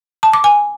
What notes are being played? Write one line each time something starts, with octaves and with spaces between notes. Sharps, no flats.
A5
D6
G#5